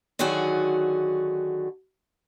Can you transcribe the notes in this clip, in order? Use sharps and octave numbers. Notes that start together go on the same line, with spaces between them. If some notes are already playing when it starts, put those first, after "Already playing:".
D3 D#3 F#3 F#4 G#4